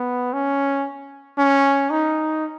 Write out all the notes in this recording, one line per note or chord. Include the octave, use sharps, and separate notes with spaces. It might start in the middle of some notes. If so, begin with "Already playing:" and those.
Already playing: B3
C#4
C#4
D#4